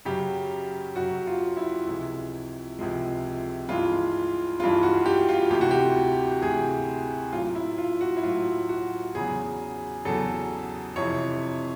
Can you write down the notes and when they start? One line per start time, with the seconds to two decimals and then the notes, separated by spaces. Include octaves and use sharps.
0.05 F#2 C#3 F#3 G4
0.96 F#2 C#3 F#3 F#4
1.27 F4
1.57 E4
1.87 C#2 C3 F3 G#3
2.79 C#2 C3 F3 G#3
3.69 G2 E3 G#3 F4
4.59 G2 E3 G#3 F4
4.83 F#4
5.06 G4
5.29 F4
5.50 D2 C3 E3 G4
5.61 F#4
5.71 G4
6.41 D2 C3 E3 G#4
7.32 A2 F#3 F4
7.55 E4
7.78 F4
8.01 F#4
8.17 E4
8.23 A2 F#3 F4
8.69 F#4
9.15 E2 C#3 F#3 G#4
10.05 E2 C#3 F#3 A4
10.96 F2 C3 E3 C#5